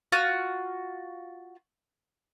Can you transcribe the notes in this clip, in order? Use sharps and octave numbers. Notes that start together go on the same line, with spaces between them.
F4 F#4 F6 F#6